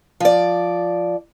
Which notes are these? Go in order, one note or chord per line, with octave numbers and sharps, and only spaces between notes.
F3 D5